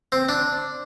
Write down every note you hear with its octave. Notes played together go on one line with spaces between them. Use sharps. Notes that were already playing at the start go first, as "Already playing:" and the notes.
C4
D4